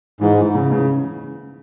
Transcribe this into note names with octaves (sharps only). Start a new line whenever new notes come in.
G#2 E3
E3
C#3
C#3